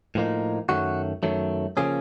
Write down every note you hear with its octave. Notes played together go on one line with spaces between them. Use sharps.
A2 F3 A#3 D#4
F#2 D#3 F#3 A3 F#4
F#2 D#3 F#3 A3
C#3 F3 A#3 C#4 G#4